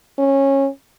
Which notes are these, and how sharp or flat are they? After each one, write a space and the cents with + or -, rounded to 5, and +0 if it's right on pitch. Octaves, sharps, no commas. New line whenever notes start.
C#4 -20